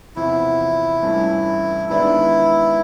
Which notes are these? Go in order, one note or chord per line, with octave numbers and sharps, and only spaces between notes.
E2 C3 F3 E4
G2 E3 A3 C#4
D#3 G#3 B3 D4 E4